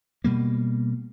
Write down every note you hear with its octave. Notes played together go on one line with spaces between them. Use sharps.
B2 G3 A#3